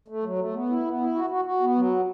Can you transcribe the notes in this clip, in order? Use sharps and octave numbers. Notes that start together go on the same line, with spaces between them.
A3
F#3
A3
B3
E4
B3
E4
F#4
F#4
F#4
B3
F#3